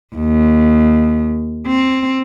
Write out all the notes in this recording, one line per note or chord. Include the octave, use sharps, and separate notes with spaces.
D#2
C4